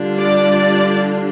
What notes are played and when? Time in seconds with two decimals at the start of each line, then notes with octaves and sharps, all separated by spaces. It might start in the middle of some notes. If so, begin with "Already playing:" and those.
Already playing: D3 G3 D4 F4
0.19 D5